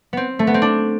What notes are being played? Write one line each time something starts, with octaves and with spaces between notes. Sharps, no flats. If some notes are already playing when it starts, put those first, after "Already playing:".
B3 C4
A3
B3
C4
D4